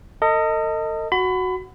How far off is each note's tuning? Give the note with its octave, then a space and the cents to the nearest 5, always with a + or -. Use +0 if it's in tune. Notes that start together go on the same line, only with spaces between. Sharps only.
A4 +45 D#5 +5
F#4 +0 B5 +30